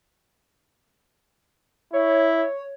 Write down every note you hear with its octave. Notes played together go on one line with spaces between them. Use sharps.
E4 C#5